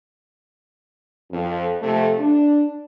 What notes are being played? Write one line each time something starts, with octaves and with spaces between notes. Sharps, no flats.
F2
C3 F3 A3
D4